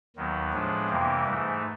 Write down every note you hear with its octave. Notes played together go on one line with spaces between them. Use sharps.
D#2 D#3 F#3 B3
A2 F3 G#3 B3 D4
F2 C3 E3 G3 A#3
G#2 E3 A3